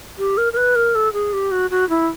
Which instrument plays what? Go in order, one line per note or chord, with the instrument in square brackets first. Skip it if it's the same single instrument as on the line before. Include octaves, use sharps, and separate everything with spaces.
[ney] G4
A#4
A#4
B4
A#4
A4
G#4
G4
F#4
F#4
E4